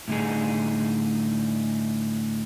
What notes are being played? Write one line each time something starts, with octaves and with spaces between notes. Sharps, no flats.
A2 D3 G3 D#4 G#4